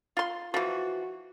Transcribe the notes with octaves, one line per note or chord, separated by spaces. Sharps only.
F4 C6
E3 F3 F#4